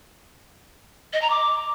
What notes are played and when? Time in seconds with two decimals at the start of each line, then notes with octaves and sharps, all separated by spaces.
1.13 D#5
1.22 A#5
1.30 D6